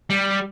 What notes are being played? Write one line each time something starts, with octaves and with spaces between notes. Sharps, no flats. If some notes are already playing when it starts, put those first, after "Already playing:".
G3